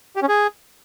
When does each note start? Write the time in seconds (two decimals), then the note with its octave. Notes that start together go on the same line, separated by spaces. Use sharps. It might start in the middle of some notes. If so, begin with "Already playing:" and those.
0.16 G4
0.22 C#4
0.28 G#4